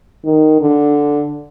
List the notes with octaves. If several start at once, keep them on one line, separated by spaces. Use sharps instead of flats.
D#3
D3